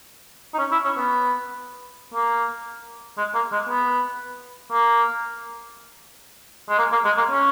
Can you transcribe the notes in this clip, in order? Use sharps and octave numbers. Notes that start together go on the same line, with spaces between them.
D#4
C#4
E4
C#4
B3
A#3
G#3
A#3
G#3
B3
A#3
G#3
A#3
A#3
G#3
A#3
C#4